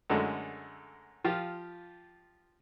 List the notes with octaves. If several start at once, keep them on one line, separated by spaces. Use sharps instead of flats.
F#2 D3 G#3 A3
F3 F4 G4